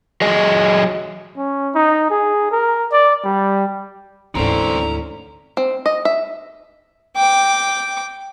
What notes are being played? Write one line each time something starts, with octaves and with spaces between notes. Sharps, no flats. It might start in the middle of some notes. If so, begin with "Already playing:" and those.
F#3 G#4 D#5
C#4
D#4
G#4
A#4
D5
G3
D2 G#2 D3 E3 C4 C#4 E4 A#5
C4
D#5
E5
G5 D6